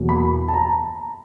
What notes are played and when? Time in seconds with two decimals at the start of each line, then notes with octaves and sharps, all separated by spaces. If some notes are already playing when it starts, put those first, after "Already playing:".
Already playing: E2 B2 F#3 A#3
0.09 B5
0.48 A5
0.54 A#5